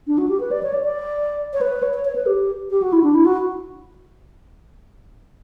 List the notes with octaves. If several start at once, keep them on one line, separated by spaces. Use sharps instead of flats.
D4
F#4
G4
B4
D5
C#5
D5
D5
C#5
B4
C#5
C#5
C#5
B4
G4
G4
F#4
E4
D4
E4
F#4